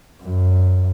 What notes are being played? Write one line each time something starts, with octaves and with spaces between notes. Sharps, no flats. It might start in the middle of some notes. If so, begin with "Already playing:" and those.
F#2